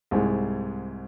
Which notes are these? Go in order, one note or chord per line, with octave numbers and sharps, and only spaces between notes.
C2 G#2 G#3